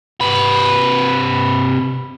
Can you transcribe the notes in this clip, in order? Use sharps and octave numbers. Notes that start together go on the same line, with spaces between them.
C3 B4